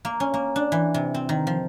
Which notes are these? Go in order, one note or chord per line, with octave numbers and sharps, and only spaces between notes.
A#3
C#4
A#3
D4
E3
C3
C4
D#3
F3